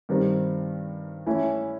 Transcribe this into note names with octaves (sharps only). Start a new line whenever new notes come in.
G2 D#3 G3 C4
E3 A3 C#4 E4